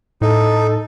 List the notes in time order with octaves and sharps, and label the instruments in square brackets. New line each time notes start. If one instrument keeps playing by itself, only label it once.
[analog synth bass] A2 [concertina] D#4 [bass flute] A4